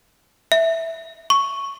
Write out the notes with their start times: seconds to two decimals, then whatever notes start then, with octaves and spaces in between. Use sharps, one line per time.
0.52 E5
1.30 C#6